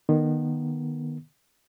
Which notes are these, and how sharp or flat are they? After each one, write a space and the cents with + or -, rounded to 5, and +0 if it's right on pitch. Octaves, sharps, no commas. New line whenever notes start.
D#3 -20 B3 -25